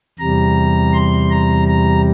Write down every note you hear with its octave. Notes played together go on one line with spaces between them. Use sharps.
E2 C3 G3 A#5
C6
A#5
A#5